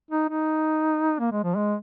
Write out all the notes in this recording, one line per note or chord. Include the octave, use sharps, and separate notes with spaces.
D#4
D#4
A#3
G#3
F3
G#3